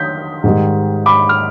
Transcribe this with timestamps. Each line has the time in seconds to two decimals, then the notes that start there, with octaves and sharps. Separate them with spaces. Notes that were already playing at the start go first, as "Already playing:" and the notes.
Already playing: D#3 G6 B6
0.44 G#2 D#3 G3
1.06 B5 D6
1.29 F6